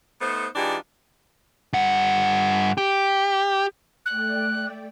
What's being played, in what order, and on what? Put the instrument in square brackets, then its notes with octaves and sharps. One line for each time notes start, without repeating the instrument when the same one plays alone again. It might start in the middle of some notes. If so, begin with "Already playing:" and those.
[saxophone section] A3 B3 D#4 C5
E3 G#3 D4 D#4 F4 G4
[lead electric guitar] G2 F#5
G4
[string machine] A3 D5 G5 [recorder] F#6